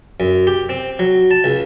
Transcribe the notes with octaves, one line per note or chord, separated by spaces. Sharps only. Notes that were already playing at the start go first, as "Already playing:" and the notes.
F#2
G4
C4
F#3
A5
C#2